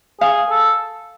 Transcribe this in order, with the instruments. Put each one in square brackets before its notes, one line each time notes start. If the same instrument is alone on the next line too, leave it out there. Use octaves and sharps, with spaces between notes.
[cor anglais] G#4 [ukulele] F5
[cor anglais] A4